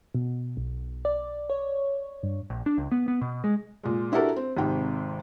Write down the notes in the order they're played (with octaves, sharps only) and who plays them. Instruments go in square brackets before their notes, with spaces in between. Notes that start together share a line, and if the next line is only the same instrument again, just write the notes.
[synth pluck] B2
B1
D5
C#5
G2
[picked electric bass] A#1
D4
C#2
B3
B3
B2
G#3
[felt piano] A#2 G#3
D4 E4 F#4 G4 A4 A#4
C4
G#1 G#2 C3 G5